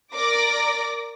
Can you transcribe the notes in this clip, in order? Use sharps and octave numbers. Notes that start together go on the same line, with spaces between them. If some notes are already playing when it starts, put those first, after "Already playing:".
A#4 D5 D6 A#6